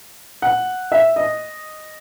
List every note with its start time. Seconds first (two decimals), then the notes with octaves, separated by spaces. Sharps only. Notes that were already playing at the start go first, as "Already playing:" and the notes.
0.42 F#5
0.92 E5
1.16 D#5